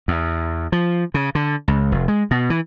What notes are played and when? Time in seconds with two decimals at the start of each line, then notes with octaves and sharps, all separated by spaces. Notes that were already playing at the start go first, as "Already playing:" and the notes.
0.08 E2
0.72 F3
1.14 C#3
1.35 D3
1.68 C#2
1.92 F1
2.08 G#3
2.31 B2
2.50 E3